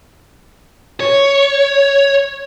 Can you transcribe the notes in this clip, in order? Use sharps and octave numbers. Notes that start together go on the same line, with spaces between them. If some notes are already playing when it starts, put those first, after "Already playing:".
C#5